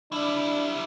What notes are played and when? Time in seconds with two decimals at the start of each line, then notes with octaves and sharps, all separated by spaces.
0.12 G3 D4 E4